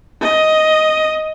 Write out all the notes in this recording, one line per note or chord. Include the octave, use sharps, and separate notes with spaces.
D#5